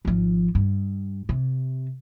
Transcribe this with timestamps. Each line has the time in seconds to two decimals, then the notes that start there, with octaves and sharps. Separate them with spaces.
0.05 G#1 F3
0.55 G2
1.29 C3